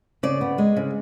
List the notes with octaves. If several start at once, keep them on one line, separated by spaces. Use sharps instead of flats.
C#3 D5
B3
G#3
C#3